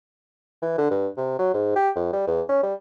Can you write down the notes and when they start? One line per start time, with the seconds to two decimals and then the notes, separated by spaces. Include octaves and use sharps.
0.62 E3
0.78 D3
0.91 G2
1.17 C3
1.39 F#3
1.54 G#2
1.76 G4
1.95 F2
2.13 G3
2.27 E2
2.49 C#4
2.63 G3